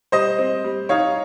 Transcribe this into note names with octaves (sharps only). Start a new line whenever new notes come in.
G3 C5 D#5
C4
G3
D#4 C#5 F5